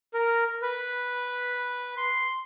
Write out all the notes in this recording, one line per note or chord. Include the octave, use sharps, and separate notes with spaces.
A#4
B4
C6